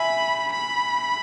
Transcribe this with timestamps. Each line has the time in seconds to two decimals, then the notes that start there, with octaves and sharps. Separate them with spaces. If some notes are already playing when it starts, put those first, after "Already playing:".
Already playing: E5 G#5 B5
0.52 B5